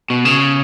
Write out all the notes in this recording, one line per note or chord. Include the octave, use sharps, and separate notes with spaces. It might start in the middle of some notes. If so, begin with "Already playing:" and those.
B2
C#3